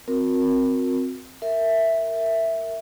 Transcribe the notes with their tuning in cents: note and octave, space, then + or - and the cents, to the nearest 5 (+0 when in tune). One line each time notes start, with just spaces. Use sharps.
C4 +0 F#4 -40 A#4 +0
A#4 -20 E5 +0